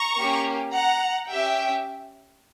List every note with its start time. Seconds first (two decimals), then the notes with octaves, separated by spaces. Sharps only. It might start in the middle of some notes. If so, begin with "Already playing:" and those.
Already playing: A#5 C#6
0.17 A#3 C#4 G4
0.73 F#5 A#5
1.30 C#4 G4 E5 G5